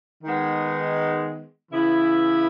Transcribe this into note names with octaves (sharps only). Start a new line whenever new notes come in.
D#3 G#3 B3
C#3 E3 B3 E4